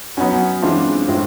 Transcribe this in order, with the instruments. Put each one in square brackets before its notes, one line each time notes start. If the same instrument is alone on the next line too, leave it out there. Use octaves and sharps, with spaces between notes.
[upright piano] F#3 B3 D#4 F#4 [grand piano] C#4
[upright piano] E3 G#3 C4 F4 [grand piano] D4
[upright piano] A2 F3 G#3 C4 F4